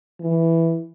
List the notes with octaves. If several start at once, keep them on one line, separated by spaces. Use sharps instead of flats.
E3